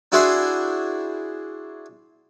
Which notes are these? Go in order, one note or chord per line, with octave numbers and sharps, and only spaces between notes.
D4 E4 F#4 G#4 C5 E5